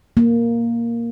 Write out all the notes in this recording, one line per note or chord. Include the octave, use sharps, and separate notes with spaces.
A#3